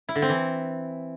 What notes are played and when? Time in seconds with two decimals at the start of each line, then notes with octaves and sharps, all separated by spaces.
0.09 E4
0.15 D3
0.22 C4
0.29 E3